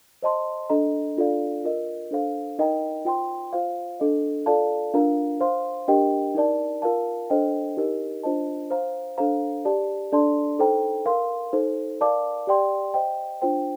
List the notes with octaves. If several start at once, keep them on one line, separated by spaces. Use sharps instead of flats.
C5 D#5 A5 C6
D4 A4 D#5 A#5
D4 F4 A4 D5 F5
F4 A#4 D#5
D4 A4 C5 F5
D#4 A#4 D#5 G5 A#5
F4 C5 G5 C6
F4 C5 F5
D4 A4 D#5
F4 A4 D5 F5 A5
D4 F4 A#4 F5 A#5
C5 F5 C6
D4 G4 A#4 D#5 G5
D#4 A#4 D5 A5
F4 A#4 F5 A5
D4 A4 C5 D#5 G5
D#4 G4 A#4 D#5
D4 F4 C5 D#5 A5
C5 F5 A#5
D4 A4 C5 F5 A#5
G4 D5 A5
D4 A4 D5 A5 C6
D#4 A4 C5 G5 A#5
A#4 F5 C6
D#4 A4 C5
A#4 D5 F5 A5 D6
G4 D5 G5 C6
C5 D#5 G5
D4 F4 C5 G5